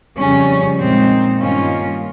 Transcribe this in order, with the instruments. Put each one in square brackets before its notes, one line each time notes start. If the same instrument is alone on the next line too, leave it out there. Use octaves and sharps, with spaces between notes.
[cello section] F2 C#3 G3 [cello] C#4
[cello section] A#2 G#3 D#4 [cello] C4
[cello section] G2 D#3 A#3 F4 [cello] C#4